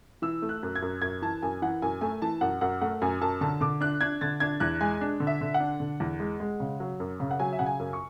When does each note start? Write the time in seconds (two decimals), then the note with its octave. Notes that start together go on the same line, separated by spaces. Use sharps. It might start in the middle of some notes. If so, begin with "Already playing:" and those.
0.22 E3 E6
0.42 A3
0.49 F#6
0.63 F#2
0.75 G#6
0.82 F#2
1.02 F#2 G#6
1.22 E3 A5
1.42 F#2 G#5
1.62 E3 F#5
1.82 F#2 G#5
2.01 A3 G#5
2.22 E3 A5
2.41 F#2 F#5
2.61 F#2 F#5
2.81 A3 F#5
3.01 F#2 G#5
3.21 F#2 A5
3.41 D3 A5
3.61 D3 D6
3.81 D4 F#6
4.01 D4 G#6
4.21 D3 A6
4.40 D4 G#6
4.60 E2 F#6
4.81 G#3 G#5
5.01 D4
5.20 D3
5.27 E5
5.41 D3
5.54 F#5
5.60 D4
5.80 D3
6.00 E2
6.20 G#3
6.40 G#3
6.60 C#3
6.80 F#3
7.00 F#2
7.20 C#3
7.31 F#5
7.39 F#3 G#5
7.52 E5
7.59 C#3 F#5
7.66 G#5
7.79 F#2
7.93 C#6